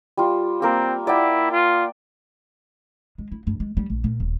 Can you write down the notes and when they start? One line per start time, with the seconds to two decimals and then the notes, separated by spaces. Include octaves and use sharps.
0.17 G3 F4
0.62 A#3 C4 A#4
1.07 E4 D5 F#5 G5
1.51 F4
3.18 G#3
3.32 E4
3.47 G2
3.60 G#3
3.77 G3
3.90 A#1
4.04 A#2
4.20 D#1